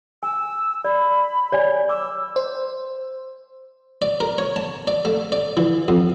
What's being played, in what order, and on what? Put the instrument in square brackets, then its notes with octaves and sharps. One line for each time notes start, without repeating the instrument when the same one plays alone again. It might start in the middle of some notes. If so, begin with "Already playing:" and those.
[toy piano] G#5 [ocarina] E6
[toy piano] D5 [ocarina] B5
[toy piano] C#5 D5 G#5
[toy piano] D6 [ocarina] E6
[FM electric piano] C5
[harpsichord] D5
A#4
C#5
A5
D5
A3
D5
E3
F2